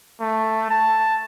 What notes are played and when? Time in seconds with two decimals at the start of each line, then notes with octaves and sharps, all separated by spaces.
0.21 A3
0.71 A5